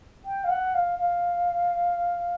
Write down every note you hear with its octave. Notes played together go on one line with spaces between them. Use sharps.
G5
F5
F#5
F5
F5